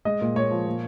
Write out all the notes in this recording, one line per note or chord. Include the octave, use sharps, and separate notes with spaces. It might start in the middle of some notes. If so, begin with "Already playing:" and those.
G#3 D#5
A#2
A#2 C#5
F3
A#2